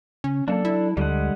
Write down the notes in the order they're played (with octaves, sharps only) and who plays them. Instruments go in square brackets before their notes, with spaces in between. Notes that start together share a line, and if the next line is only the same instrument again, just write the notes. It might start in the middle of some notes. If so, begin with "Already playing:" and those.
[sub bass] C#3 [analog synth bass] C#4
[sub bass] F#3 [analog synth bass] A#3 [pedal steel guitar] D4 A4
[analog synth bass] E4
[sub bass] D2 [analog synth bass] D3 [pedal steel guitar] G3 G#3 F#5